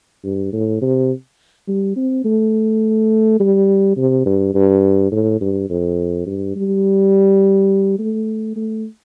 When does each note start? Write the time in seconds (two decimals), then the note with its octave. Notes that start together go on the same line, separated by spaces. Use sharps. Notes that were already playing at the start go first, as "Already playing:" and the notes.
0.24 G2
0.53 A2
0.82 C3
1.68 G3
1.96 C4
2.24 A3
3.40 G3
3.97 C3
4.26 G2
4.54 G2
5.12 A2
5.41 G2
5.70 F2
6.26 G2
6.56 G3
7.99 A3
8.56 A3